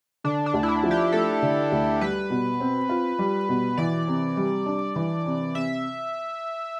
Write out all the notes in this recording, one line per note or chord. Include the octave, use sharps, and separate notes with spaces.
D3 D4
D4
D2
E4
D4
F3
G4
A3 A4
D3
D2
G3 B4
B2
C4
F4
G3
B2
E3 D5
C3
G3
D4
E3
C3
C3 E5